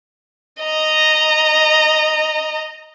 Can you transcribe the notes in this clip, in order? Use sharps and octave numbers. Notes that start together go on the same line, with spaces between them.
D#5 A#5